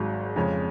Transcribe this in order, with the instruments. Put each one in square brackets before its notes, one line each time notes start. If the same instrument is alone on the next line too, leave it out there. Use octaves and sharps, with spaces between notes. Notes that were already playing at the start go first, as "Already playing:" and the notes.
Already playing: [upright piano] G#1 G#2 F#3
F2 C#3 G#3 C#4